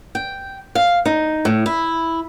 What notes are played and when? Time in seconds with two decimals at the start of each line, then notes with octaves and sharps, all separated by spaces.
0.15 G5
0.75 F5
1.06 D#4
1.45 A2
1.66 E4